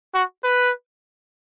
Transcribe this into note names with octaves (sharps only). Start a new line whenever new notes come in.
F#4
B4